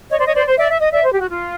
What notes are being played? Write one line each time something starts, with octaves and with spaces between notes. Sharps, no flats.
C#5 D#5
C5 D5
C#5 D#5
C5 D5
C5
D5 E5
E5
D#5
D5 E5
C5
G4
F#4
F4